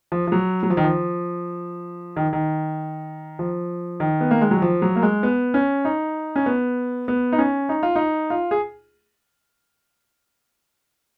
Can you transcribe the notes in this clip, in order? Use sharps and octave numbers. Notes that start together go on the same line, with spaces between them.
F3
F3
F#3
F#3
F3
D#3
F3
D#3
D#3
F3
D#3
B3
A#3
G#3
F#3
F3
F#3
A#3
G#3
B3
C#4
D#4
C#4
B3
B3
D#4
C#4
D#4
F4
D#4
F4
G#4